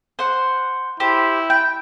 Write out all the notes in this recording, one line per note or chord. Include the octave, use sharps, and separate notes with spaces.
C5 F#5
E4 G4 C5
G5